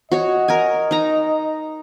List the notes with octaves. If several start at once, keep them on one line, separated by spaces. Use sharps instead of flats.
F#4 C#5 D#5
A#4 G#5
D#4 A#5